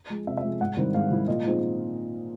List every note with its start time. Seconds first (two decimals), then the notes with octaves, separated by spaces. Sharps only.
0.09 F3 G#3
0.27 C3 E5
0.37 E5
0.43 F3 G#3
0.61 G#2 F#5
0.77 D#3 G3 C4 E4
0.94 G#2 F5
1.11 D#3 G3 C4 E4
1.28 A#2 D#5
1.45 F3 G#3 C4 D#4